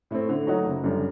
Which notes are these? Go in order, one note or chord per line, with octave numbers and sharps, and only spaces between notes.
A2 A3 C4
D3
F#3 A3 D#4 F#4
F#1
F#2 D3 G3